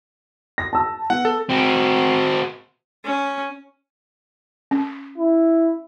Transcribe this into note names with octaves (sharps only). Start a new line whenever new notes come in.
A#6
A5 E6
B3 F#5
A4
C4 F#4
C#4
C#4
E4